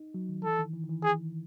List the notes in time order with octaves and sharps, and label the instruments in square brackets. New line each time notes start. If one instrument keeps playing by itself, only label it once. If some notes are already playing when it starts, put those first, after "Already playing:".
Already playing: [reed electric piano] D#4
F#3
D#3
[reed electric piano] E3 [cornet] A4
[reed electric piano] D#3
E3
D#3
E3
[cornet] G#4